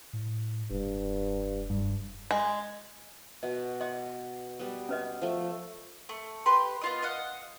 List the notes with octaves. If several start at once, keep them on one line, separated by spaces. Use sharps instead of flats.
A2
F1 G2
G2
G#3
B2 D#5
D#5 F#5 D6
G3 B3
C#4 B4 D#5
F3 A3
A3
G4 B4 C6
B3 F4 D#5
D#5 F5 F#5